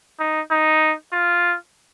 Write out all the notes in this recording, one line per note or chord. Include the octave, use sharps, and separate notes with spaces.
D#4
D#4
F4